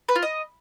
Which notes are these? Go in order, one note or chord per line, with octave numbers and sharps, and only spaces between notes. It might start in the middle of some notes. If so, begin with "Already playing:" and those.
B4
F4
D#5